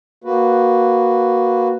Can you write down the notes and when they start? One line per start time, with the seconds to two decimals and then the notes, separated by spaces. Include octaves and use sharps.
0.24 A#3 F#4 B4